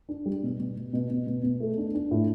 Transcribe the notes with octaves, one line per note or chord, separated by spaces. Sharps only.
D4
G3
B2
B2
B2
B2
B2
B2
B2
A3
D4
D4
A2